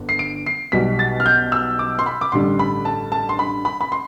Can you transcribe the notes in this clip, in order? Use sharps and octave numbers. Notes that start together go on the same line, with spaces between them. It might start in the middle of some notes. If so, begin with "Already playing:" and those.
Already playing: G1 D3
C7
D7
C7
B1 B2 G3 B6
A6
F6
G6
E6
D6
C6
B5
D6
A1 G2 D3 G3 C6
B5
A5
A5
C6
B5
B5
B5
C6